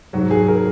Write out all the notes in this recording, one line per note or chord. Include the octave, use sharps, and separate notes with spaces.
G#2 F#3 F#4
G#4
A#4